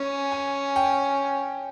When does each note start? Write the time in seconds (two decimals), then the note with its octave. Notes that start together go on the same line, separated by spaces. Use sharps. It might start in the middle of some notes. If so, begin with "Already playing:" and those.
Already playing: C#4 G#5
0.32 G#5
0.76 G5